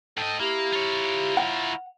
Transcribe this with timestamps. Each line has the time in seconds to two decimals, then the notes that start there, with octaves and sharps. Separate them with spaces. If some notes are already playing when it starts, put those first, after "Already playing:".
0.17 G#2 A4 D#5 G5
0.40 A#3 E4 G4 A#5
0.73 F4 C#5
1.37 F#5